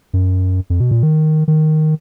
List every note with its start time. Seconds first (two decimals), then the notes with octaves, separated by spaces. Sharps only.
0.13 F#2
0.70 F2
0.80 B2
0.91 A#2
1.03 D#3
1.48 D#3